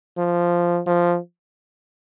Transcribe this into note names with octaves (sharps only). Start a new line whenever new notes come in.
F3
F3